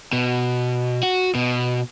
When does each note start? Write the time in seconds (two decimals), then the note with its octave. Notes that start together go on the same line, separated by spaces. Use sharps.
0.13 B2
1.03 F#4
1.35 B2